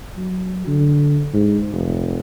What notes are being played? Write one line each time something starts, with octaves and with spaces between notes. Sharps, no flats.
F#3
D3
G#2
F1